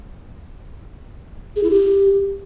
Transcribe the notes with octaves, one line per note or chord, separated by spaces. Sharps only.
G#4
E4
G4